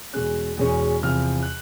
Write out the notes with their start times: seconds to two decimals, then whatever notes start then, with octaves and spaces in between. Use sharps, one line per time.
0.13 E2 B2 G#3 C#4 F#6
0.57 E2 B2 G#3 C#4
1.02 E2 C3 F3 F6
1.43 F#6